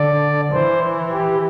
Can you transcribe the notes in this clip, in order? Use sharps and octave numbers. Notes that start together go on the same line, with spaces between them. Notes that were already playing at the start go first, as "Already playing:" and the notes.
Already playing: D3 D5
E3 C5
G4